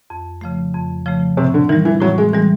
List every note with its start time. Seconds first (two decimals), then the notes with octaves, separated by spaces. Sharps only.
0.10 F2
0.41 C#3 F3 A3
0.74 F2
1.06 C#3 F3 A3
1.37 A2 C3
1.54 D3
1.69 D#3 E3 G3
1.85 E3
2.01 A2 F#3
2.18 G#3
2.33 E3 G3 G#3